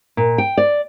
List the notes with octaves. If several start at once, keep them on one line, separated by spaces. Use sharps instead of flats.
A#2
G5
D5